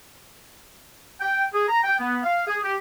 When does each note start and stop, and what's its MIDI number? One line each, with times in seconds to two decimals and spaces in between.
1.21 1.46 79
1.54 1.66 68
1.69 1.80 82
1.84 1.99 79
1.99 2.18 59
2.23 2.46 77
2.47 2.57 68
2.63 2.76 67